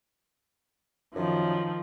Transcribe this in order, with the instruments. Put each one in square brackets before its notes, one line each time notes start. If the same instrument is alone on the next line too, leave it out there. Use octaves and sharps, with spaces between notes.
[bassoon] F#2 [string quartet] D#3 F3